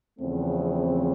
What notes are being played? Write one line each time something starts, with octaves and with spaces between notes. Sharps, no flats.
E2 C#3 F3 A3 C4